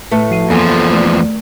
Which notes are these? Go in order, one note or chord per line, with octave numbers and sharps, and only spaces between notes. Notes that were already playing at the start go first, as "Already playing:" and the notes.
A2 A3 B4
F3 C7 D#7
E2 F3 A#3 A4 G#5
A3 D5